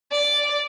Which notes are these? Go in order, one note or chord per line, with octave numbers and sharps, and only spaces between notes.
D5